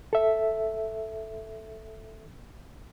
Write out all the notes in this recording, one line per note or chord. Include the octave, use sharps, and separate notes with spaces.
A4 E5